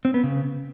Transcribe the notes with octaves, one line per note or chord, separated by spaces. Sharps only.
C4
B3
C#3